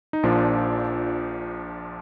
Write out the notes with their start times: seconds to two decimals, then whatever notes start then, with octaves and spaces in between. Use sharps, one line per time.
0.13 D#4
0.23 A#1 A#2 F3 D4